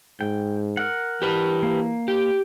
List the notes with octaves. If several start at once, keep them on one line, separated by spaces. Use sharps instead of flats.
G#2 G5
A#4 F#5
E3 G4 B4
A#3
G4